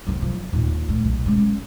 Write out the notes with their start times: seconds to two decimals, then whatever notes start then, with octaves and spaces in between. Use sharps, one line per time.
0.07 C3 F#3
0.22 F3
0.53 D#2 A#2
0.89 A3
1.05 B1
1.26 G#3 C#4